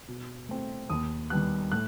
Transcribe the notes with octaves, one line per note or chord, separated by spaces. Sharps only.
B2
A3 C4
D#2 D#6
D#3 G3 B3 F#6
A2 F#6